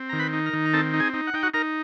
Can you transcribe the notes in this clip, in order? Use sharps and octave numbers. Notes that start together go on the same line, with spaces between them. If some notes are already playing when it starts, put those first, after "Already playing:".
Already playing: C4
D#3 A#5
B4 B5
D#4
A#4 A#5
D#3
A#5
C4 A4 A5
D#4
G#4 G#5
D#4
F#5
D#4 G5
F#4 F#5
D#4 A#4 A#5